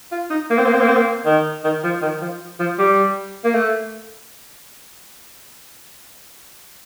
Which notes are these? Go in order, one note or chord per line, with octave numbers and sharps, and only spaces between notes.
F4
D#4
A#3
C4
A#3
C4
A#3
C4
A#3
D#3
D#3
F3
D#3
F3
F3
G3
A#3
A3